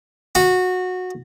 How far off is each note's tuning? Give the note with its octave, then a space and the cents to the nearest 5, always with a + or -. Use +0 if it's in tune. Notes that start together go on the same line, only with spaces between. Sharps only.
F#4 -15